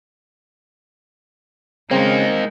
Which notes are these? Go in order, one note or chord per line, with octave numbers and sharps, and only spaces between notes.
C#3 G#3 A#3 C4 D#4